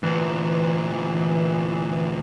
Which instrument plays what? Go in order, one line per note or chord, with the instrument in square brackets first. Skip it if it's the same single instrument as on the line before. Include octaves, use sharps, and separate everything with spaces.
[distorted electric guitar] D2 A#2 [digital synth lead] E3